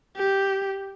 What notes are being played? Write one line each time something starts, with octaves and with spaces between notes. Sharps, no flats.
G4